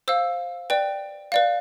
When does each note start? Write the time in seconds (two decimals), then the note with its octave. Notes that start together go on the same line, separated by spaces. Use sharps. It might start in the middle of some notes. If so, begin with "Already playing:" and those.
0.08 C5 F5 E6
0.70 B4 D5 G5
1.32 B4 D5 F5